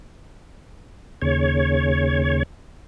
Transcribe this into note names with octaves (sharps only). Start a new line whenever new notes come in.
D#2 C#3 C#5